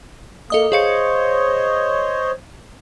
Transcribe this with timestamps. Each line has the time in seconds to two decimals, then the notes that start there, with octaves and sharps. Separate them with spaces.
0.50 A#3 A4 D#5 D#6
0.72 G#4 C5 C#5 D#5 F5 C#7